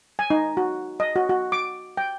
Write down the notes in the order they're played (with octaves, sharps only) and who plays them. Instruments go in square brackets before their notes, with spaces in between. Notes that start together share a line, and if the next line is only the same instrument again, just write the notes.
[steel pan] G#5
D#4
F#4
D#5
F#4
F#4
D6
G5